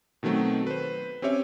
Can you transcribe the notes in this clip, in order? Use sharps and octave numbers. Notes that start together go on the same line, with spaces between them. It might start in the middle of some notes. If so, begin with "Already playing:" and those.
B2 D#3 F#3 A3 C4
B4 C5
C4 C#4 G4 C#5 E5